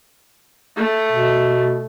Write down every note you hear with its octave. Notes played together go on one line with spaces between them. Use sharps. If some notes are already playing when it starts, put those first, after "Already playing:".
A3
B2